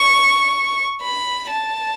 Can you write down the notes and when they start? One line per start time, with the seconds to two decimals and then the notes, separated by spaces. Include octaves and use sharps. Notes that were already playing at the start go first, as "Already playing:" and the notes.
Already playing: C#6
1.02 B5
1.50 A5